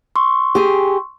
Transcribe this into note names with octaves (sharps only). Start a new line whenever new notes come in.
C6 C#6 E6
G4 G#4